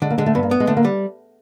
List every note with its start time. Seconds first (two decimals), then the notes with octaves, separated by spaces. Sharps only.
0.02 D3 G#3
0.10 A#3
0.18 D3 G#3
0.26 A3
0.35 G2 B3
0.43 A#3
0.51 B3
0.60 G#3
0.67 D3 A3
0.77 A#3
0.85 G3